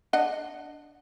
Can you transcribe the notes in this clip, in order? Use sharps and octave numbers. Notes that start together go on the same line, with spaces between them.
D4 D#5 F#5